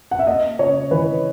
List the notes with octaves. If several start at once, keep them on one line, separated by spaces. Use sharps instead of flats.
F#5
E5
A#3 D#5
C#3 C#5
E3 B4